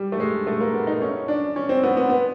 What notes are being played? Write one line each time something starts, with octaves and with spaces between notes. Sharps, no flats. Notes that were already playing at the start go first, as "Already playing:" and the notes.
Already playing: G3
A3
G#3
A3
A#3
B3
D#4
C#4
D4
C#4
C4
B3
B3
B3